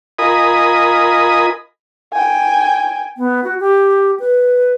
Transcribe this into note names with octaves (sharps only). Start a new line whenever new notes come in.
F4 A#4 D#5 G#5 B5 D#6
G5 G#5
B3
F#4
G4
B4